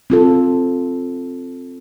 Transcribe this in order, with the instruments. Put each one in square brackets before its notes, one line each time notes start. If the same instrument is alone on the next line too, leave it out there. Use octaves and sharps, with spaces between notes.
[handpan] C4 F4 A4